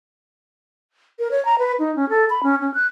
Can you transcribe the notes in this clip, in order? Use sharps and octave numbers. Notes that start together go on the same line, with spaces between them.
A#4
C#5
A#5
B4
D#4
C#4
A4
B5
C#4
C#4
F#6